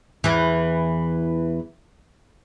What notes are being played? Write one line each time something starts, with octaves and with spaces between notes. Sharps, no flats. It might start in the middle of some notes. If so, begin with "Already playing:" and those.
E2 E3